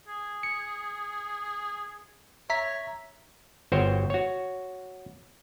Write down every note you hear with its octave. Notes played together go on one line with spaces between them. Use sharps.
G#4
C#7
C#5 E5 A#5 B6
G1 F#4 C5 C#5 G5
F#4 C#5